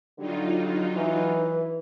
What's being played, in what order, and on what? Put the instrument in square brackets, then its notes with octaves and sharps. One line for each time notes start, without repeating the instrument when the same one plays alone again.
[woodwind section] D3 G3 [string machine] F#3 D#4 F4
[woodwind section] E3